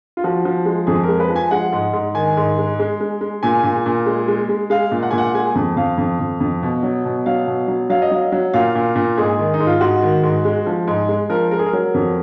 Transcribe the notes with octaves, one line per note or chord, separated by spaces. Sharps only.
F4
F3 F#4
F3
G#3
F2 G#4
A#4
G#3
B4
F3
G#5
G#3 F#5
G#2
G#2
D#3 G#5
G#2
G#3
G#3
G#3
G#3
A#2 G#5
A#2
A#2
G#3
G#3
G#3
G#3 F5
A#2
F#5
A#2 G#5
F#5
G#3 G#5
F2
F2 F5
F2
F2
F2
B2
F#3
B2
F#3 F5
B2
F#3
F#3 F5
D#5
F#3 F5
F#3
A#2 F5
A#2
A#2
G#2 G#4
D#3
D#4
G#2
F4
G#2 F#4
D#3
G#2
G#3
F3
G#2
G#3
F3 A#4
G#3 A#4
G#4
A#4
F#3
F2